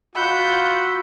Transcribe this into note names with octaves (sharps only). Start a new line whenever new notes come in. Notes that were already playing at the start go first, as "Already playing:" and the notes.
F4 F#4 F#5 B5 E6 G6